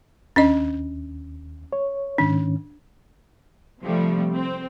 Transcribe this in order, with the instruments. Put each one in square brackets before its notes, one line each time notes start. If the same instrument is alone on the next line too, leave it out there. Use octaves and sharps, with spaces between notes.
[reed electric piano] D#2 [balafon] C#4 D4 D#5
[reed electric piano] C#5
[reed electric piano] G#2 D#3 C#4 [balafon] D4
[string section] C3 F3 G3 A3
C4